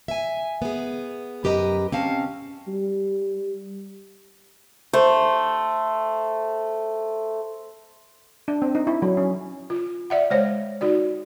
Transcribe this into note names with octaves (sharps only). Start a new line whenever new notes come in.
E5 G#5
B3 G#4
F#2 G4 B4 D#5 A#5
C4 C#4 F5 A5
G3
A3 C5
D4
C4
D#4
E4
F#3
C#4
F4
D5 E5 F#5
G#3 C5 C#5
D#4 F#4 D5